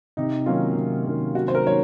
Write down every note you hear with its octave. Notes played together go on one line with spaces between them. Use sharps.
C3 D#4
D#3 F#3 A#3 C#4 F4
C3
D#3 F#3 A#3 C#4
C3 F#4
C5
A#4
D#3 F#3 A#3 C#4 C#5